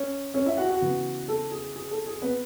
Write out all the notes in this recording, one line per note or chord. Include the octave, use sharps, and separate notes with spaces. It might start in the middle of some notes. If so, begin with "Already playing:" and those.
Already playing: C#4 C#5
C#4 C#5
E4 E5
F#4 F#5
F#4 F#5
C#3 E3 B3
A4
G#4
G#4
A4
G#4
B3 B4